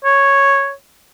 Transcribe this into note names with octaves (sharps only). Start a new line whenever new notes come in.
C#5